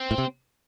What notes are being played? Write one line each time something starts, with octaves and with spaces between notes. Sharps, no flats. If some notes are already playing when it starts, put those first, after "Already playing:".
Already playing: C4
A2
C3